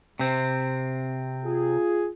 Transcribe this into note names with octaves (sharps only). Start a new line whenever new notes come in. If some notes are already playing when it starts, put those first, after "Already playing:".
C3 C4
F4 G#4